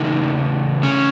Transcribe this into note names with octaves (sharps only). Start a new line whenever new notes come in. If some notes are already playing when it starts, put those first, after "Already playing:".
Already playing: C#3 E3 A3 D#4
C#4